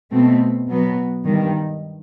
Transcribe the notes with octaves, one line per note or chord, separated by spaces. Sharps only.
B2 A3 C4
B2 F#3 B3
G2 D#3 G3